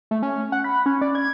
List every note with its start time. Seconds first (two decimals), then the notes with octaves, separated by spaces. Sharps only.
0.11 A3
0.23 C#4
0.52 F#5
0.64 B5
0.86 C#4
1.01 D5
1.15 G#6